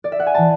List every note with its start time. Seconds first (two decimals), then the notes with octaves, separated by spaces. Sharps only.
0.04 D5
0.12 E5
0.20 F#5
0.27 G#5
0.34 E3 A5